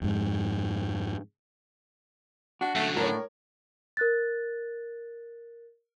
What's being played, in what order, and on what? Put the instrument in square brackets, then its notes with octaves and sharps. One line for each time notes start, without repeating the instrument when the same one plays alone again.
[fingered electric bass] F2 G#2
[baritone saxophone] D4 [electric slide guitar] F#4
[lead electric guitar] F#2 D3 [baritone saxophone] A3
[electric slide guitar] A2 [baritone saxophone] D4 [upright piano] A#4 C#5
[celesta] A#4 F#6 A6